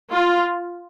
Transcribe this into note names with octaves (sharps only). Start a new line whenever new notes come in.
F4